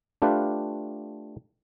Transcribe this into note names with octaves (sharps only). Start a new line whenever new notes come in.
A3 D4 F4 G4 B4 F5